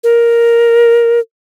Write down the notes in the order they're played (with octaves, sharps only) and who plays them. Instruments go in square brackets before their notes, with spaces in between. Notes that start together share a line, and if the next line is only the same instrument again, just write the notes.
[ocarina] A#4